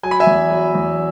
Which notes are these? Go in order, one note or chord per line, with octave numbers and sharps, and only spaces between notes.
F#3 G#5
B5
E5 G#5
E2
F#3
E2